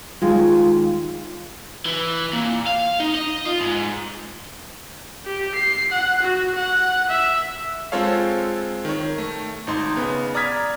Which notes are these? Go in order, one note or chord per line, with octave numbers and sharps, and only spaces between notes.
D#2 G#3 F4
E3
A#2
F5
D#4
D#5
F4
G#2
G4
C7
F#5
F#4
F#5
E5
G#3 C4 F4 A4 C#5 F5
D#3 C#5
A3
G#1 D#4 C6
C#3 B3
D5 A#5 D#6 F6 G#6 B6